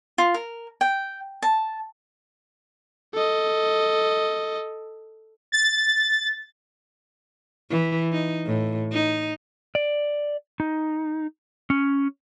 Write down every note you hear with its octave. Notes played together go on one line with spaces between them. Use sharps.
F4
A#4
G5
A5
A4 D#5
A6
E3
D#4
A2
D#4
D5
D#4
C#4